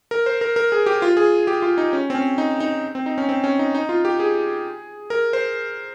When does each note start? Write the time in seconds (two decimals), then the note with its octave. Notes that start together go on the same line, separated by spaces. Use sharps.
0.11 A#4
0.26 C5
0.41 A#4
0.56 A#4
0.72 G#4
0.86 G4
1.02 F4
1.17 G#4
1.47 G4
1.62 F4
1.78 D#4
1.93 C#4
2.10 C4
2.15 C#4
2.38 D#4
2.60 D#4
2.95 C4
3.06 D#4
3.18 C#4
3.29 C4
3.44 C#4
3.59 D#4
3.75 D#4
3.89 F4
4.05 G4
4.20 G#4
5.10 A#4
5.33 C5